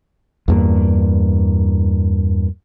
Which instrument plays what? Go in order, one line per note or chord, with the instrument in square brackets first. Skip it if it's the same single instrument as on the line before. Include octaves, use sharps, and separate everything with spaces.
[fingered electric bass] E2 G2 A#3